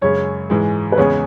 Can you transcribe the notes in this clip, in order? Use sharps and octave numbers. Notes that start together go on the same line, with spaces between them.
F#2 C#3 G#3 C#5
G#2 E3 G#3
B4
E2 C#3 G#3 B3 C#5